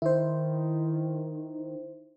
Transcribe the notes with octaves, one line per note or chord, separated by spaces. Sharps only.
D#3 E4 C5